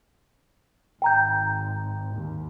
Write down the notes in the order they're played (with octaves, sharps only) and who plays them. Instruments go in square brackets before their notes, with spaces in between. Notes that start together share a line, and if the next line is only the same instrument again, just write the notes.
[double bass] G#1 [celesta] G5 A#5 G6
[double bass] D#2